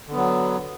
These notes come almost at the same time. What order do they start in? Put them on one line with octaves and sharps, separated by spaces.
D3 B3 F#3